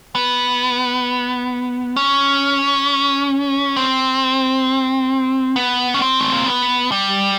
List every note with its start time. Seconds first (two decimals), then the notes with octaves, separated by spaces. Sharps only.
0.15 B3
1.96 C#4
3.76 C4
5.56 B3
5.94 C#4
6.02 C4
6.20 A3
6.32 A#3
6.46 B3
6.92 G3